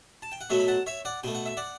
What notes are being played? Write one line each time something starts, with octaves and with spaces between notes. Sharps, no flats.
A5
G5
F#5
B2 F#3 A3 C#5 E5
B5
F#5 A5
C#5 E5
D5 F#5
B2 A3 G5
F#5
E5
D5 F#5